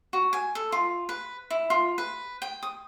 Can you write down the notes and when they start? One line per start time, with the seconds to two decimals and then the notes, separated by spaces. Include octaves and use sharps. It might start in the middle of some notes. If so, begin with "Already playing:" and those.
0.13 F#4
0.33 G#5
0.55 A4
0.72 F4
1.09 B4
1.50 E4
1.70 F4
1.98 B4
2.42 G5
2.63 D#6